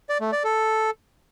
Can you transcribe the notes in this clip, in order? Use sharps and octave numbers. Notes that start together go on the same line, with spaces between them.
D5
A3
D5
A4